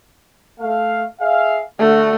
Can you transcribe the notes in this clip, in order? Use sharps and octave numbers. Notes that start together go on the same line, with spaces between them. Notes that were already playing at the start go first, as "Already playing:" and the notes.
A3 F5
G#4 E5 F5
D3 A3 F#4